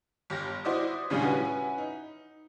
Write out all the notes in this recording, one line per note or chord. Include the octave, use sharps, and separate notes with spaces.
G1 G4 F6 A#6
E4 F#4 C5 D5 D#5 D#6
D#2 A2 C#3 G3 C#4 D4
C#4 E4 F#4 B4
D#4